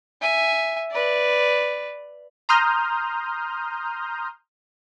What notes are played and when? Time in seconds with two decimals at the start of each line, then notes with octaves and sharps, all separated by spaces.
0.22 E5 G#5
0.91 B4 D5
2.49 A#5 C6 D#6 F6 G6